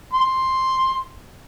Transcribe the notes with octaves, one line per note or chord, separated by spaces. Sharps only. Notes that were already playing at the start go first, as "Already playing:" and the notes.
C6